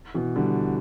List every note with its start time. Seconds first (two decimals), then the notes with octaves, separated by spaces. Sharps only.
0.14 B2 E3
0.36 D3 G3